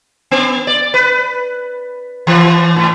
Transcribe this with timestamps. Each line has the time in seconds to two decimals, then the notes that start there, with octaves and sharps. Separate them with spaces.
0.31 B3
0.67 D5
0.94 B4
2.27 E3
2.76 A2